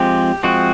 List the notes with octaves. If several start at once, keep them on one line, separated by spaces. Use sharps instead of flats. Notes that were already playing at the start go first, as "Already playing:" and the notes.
Already playing: F3 G#3 C4 G4
F3 G#3 C4 F#4